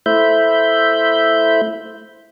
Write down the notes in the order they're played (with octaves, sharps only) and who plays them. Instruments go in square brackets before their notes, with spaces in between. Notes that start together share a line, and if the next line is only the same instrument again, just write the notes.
[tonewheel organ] A3 E4 C5 E5 B5 G6